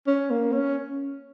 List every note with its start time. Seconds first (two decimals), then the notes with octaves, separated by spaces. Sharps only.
0.07 C#4
0.30 A#3
0.52 C#4